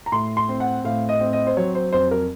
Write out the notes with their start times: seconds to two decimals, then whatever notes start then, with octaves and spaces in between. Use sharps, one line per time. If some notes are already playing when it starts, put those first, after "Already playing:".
0.06 A#5
0.12 A2 C6
0.37 C6
0.49 C4
0.60 F#5
0.84 A2 F5
1.09 D#5
1.20 C4
1.33 D#5
1.47 C5
1.57 F#3 C#5
1.75 C5
1.93 F2 C5
2.11 A#4